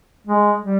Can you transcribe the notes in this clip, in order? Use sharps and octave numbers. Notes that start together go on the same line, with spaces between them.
G#3
G3